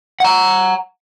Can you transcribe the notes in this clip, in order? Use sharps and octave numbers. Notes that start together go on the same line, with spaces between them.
F#5 A#5